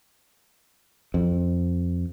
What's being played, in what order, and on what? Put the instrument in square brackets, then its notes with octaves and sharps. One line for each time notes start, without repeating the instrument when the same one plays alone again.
[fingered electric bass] F2